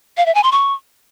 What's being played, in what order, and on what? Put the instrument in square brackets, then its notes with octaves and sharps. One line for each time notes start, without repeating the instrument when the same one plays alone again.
[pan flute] F5
E5
G#5
C6
C#6